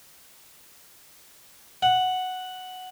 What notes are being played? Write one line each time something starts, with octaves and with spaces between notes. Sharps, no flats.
F#5